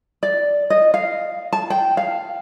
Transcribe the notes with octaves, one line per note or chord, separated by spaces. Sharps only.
D5
D#5
F5
A5
G5
F5